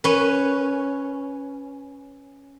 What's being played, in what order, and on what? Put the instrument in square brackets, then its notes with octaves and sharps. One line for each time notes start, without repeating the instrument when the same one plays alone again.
[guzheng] C#4 B4